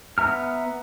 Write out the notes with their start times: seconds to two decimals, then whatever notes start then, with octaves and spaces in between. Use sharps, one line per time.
0.18 B3 E5 A#5 F6